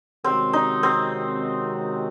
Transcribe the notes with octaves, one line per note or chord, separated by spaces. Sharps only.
C3 D#3 G#3 C4 C#4 F#4
D#4
C4